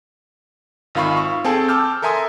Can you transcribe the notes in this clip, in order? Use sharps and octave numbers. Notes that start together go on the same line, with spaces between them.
G#1 D#3 F4 F5 B5 C#6
C#6
C4 G#4 A4 G5 A5
A5 D6 E6 F6 G6
A4 A#4 E5 G#5 C6 D#6